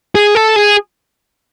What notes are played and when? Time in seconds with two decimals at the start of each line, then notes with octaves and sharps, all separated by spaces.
0.15 G#4
0.35 A4
0.56 G#4